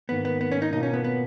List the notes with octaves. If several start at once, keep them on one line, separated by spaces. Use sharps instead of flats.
G#2 D#3 A#3 B3
B3
B3
C#4
D#4
B2 A#3 D#4 F4
C#4
B3
B3